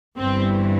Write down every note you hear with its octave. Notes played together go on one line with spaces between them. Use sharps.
G1 G2 E3 C4